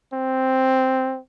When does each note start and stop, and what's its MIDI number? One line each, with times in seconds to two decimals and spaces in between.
0.14 1.19 60